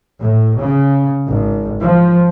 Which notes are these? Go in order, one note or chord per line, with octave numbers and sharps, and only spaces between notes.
A2
C#3
G#1
F3